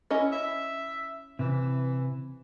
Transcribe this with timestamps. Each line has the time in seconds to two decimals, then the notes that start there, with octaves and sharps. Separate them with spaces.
0.11 C#4 E4 D#5
0.32 E5
1.39 C3 E3